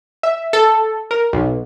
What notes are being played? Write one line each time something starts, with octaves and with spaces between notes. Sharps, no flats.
E5
A4
A#4
B1